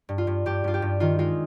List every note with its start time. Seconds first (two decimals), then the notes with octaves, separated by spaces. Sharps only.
0.09 G2
0.18 F4
0.27 G2
0.46 G2 G4
0.64 G2 F4
0.74 G4
0.82 G2
1.00 D#3 F4
1.19 G#3 F4